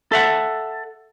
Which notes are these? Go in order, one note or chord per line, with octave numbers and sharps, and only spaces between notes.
A4 E5 F#5